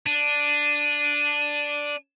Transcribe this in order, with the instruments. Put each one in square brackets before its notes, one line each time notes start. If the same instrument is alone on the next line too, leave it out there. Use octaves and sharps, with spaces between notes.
[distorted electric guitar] D4 [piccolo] D#7